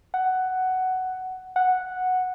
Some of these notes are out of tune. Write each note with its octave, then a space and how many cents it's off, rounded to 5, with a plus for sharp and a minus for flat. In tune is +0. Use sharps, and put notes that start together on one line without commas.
F#5 +10
F#5 -5